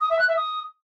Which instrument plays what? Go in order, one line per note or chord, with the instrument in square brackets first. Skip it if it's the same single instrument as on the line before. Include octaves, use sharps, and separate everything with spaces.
[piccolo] D#6
E5
F#6
E5
D#6